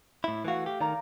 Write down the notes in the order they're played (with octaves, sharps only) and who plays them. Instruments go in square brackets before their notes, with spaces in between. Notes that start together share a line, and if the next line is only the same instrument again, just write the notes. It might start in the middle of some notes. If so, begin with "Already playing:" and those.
[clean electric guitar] A2 E4
[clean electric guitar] E3 F#4 [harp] A3 F5
[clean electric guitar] G4
[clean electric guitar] D#3 [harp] D5 A#5